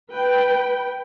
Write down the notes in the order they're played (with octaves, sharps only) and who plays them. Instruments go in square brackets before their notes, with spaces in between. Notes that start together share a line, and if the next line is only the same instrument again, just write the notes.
[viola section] B4 G5